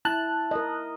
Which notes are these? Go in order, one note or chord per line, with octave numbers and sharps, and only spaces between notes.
E4 A5 F#6
A#4 D#5